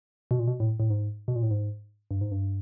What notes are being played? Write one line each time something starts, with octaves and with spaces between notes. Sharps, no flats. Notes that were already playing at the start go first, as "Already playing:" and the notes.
B2
A#2
B2
A2
A2
G#2
B2
A#2
A2
G#2
G2
G#2
G2